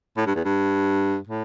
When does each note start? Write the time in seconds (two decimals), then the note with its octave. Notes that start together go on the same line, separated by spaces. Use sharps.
0.17 A2
0.26 G2
0.35 E2
0.45 G2
1.27 A2